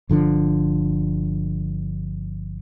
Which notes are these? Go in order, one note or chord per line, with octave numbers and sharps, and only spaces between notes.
G1 D3 F3 D4